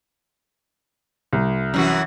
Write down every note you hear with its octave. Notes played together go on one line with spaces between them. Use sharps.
C2
F#2 E3 F#4